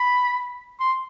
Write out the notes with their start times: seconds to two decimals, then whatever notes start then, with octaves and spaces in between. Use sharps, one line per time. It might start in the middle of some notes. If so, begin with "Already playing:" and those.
Already playing: B5
0.80 C6